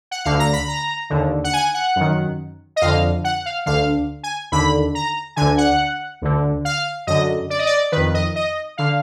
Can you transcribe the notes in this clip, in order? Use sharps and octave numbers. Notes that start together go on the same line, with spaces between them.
F#5
D2 D3 F5
A#5
B5
A#5
D#2 D3
F#5
G#5
F#5
F#2 D#3
D#5
F2 D3 F5
F#5
F5
D2 D3 F5
G#5
D#2 D3 B5
A#5
D2 D3 G#5
F#5
D2 D3
F5
F#2 D3 D#5
D5
D#5
D5
F2 D#3 B4
D#5
D#5
D3 F5